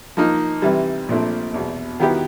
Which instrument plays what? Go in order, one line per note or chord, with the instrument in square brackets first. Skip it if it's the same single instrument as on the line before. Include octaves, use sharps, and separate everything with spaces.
[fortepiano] F3 A#3 D#4
C3 E3 G3
A#1 A#2 F3 A3 C4
E2 B2 F#3
D#3 F#3 B3 E4 G4